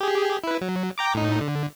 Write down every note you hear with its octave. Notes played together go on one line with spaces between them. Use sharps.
G4 G#4
E4 B4
F#3
G5 A#5 D6
A2 D#4
D3